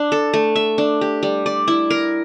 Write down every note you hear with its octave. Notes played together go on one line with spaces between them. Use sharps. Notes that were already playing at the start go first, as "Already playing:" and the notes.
Already playing: D4
A4
A3
E5
D4
G4
G3
D5
E4
A#4